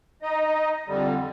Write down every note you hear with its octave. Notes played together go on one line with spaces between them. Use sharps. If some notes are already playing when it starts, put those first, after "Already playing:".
D#4 D#5
F2 D3 G3